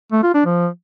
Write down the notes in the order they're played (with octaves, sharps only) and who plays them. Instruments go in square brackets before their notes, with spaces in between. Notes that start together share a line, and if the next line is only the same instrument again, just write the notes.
[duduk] A3
F4
D4
F3